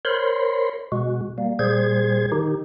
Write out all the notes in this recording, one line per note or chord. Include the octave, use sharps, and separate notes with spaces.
A#4 C5 C#5 B5 C6
B2 G#3 F#4
G3 A#3
A#2 G3 G#4 C5 G#6
D#3 D#4 G4